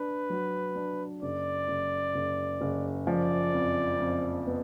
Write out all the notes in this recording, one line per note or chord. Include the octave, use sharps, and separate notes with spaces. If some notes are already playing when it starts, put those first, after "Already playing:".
Already playing: D4 B4
F#3
D4
F#1 D5
F#1
F#1
F#1
F3 D5
F2
F2
B3